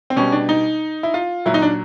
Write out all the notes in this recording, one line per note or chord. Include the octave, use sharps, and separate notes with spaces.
C4
B2 G3 C#4
D4
D#4
E4
F4
A#2 F#3 E4
D#4
D4